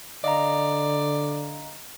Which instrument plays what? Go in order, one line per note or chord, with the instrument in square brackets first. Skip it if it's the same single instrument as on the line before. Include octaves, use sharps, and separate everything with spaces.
[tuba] D3 [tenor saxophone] D5 [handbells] D#5 F5 A#5